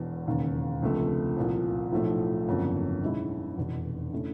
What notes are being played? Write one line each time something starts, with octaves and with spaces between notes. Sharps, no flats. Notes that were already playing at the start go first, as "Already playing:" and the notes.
Already playing: E1 E2 B2
E1 D#2 C#3
C#2 C3 F3 A3 D4
C2 A#2 F3
B1 A2 F3 A3
G1 F2 C#3 F#3 A#3
B1 B2 G#3 C#4 E4
F1 E2 B2
C#3 E3 A3 D4